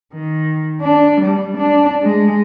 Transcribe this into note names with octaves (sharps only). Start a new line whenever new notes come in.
D#3
D4
G3
D4
G#3